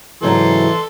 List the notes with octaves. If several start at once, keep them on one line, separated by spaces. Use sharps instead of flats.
G#2 C#3 E3 F#3 A4 C6